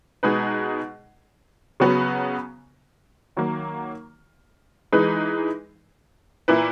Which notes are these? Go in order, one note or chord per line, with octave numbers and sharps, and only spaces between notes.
B2 G#3 D#4 G#4 B4
C#3 F#3 B3 F#4
D#3 F#3 A#3
E3 G#3 D#4 G#4 B4
A#2 A#3 E4 B4